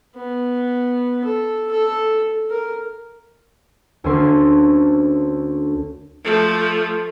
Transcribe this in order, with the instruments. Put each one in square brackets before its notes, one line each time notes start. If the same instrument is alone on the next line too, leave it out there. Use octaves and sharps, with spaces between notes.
[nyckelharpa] B3
A4
A4
A#4
[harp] D2 A#3 C#4 A4 C6
[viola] F3 A3